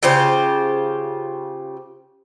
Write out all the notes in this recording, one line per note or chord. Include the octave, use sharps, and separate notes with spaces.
C#3 F4 G4 C5